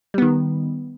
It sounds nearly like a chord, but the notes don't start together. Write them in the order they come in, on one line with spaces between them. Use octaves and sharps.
G3 B3 D#3